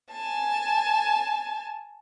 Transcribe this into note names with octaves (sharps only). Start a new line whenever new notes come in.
G#5 A5